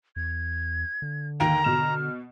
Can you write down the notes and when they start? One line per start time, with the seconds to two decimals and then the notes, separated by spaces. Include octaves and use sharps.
0.16 E2 G#6
1.02 D3
1.40 D#2 G5 A#5
1.64 B2 F6 E7